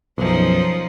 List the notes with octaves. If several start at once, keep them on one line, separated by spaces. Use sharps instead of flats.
B1 F#2 F3 C#4 D#4